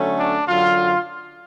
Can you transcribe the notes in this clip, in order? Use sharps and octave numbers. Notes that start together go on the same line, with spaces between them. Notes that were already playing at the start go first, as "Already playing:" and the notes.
Already playing: D3 F#3 A3 C#4
D4
F#2 D3 F#3 F4